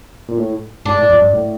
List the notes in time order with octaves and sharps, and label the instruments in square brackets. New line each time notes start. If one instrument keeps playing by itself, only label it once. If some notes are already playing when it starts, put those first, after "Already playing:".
[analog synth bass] A#2
A2
[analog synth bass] G#2 [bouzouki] D4
[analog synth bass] A2
F2
G2
A2